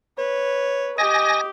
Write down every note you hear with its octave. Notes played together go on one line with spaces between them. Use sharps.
B4 C#5
G4 D#5 G#5 A#6